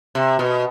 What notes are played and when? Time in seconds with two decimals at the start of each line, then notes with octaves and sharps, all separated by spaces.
0.15 C3
0.39 B2